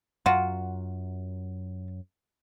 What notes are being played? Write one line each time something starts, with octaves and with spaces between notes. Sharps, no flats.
F#2 F#3 F4 F#4